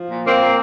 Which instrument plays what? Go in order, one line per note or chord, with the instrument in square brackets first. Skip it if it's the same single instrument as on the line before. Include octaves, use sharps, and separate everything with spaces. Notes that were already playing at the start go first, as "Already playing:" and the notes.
Already playing: [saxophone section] F3
A#2
A#2 A#3 C4
A#2